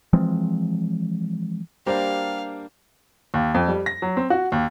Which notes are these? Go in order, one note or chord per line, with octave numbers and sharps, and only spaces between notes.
E3 F3 G#3 C4
G3 A#3 D4 G4 C5 F5 A#5
D#2
F2
G3
A#6
F#3
C4
F#4
D#2